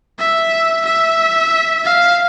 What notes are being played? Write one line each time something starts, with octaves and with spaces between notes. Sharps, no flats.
E5
E5
F5